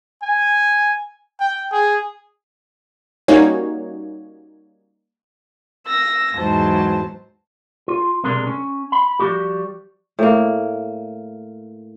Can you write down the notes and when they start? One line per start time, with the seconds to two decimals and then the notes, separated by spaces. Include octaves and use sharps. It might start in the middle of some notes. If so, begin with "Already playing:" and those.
0.22 G#5
1.40 G5
1.72 G#4
3.28 G3 A#3 C#4 D#4 F#4 C#5
5.86 E6 A#6
6.34 E2 G#2 F#3 C5 A5
7.88 F4
8.24 B1 C3 G#3 D4 A#4 C6
8.47 C#4
8.92 B5
9.20 F3 G3 A3 F#4 G4
10.19 A2 A#3